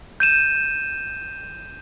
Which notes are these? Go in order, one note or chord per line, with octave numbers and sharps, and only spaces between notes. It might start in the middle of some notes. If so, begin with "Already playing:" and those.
G6 D#7 E7